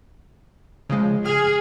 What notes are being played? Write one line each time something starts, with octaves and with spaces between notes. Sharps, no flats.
C#3 F3 G#3
G#4 F6